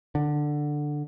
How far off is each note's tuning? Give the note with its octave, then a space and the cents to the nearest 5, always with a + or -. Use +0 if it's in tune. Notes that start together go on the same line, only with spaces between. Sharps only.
D3 +10